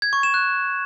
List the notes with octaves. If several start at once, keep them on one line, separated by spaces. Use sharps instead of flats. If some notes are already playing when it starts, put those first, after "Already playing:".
G#6
C#6
E7
F#6